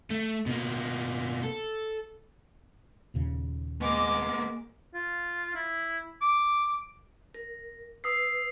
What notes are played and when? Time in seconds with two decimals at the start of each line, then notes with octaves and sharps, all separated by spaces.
0.10 A3
0.46 B2 A#3
1.43 A4
3.14 D#2 A#2 C#3
3.81 G#3 A#3 B3 D6
4.94 F4
5.55 E4
6.21 D6
7.34 A#4
8.04 B4 D#6 E6 C7